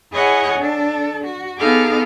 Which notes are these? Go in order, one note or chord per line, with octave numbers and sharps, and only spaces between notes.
E4 G#4 C#5 D#5 F#5 G#5
D4 A4
F#4
B3 D#4 G#4 A4 F5 D6